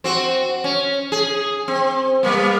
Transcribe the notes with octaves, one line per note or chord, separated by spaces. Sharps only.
C4 F#4
C#4
G#4
C4
G3 A#3 B3